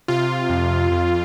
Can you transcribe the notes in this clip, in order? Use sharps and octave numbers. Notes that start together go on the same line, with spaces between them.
C3 F4
F2
F2